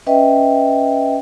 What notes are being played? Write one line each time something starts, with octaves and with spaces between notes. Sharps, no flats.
C#4 B4 D#5 E5 G5